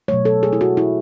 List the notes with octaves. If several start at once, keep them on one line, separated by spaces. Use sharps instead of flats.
B2 F#3 A3 C#5
A4
G#4
E4
F#4
E4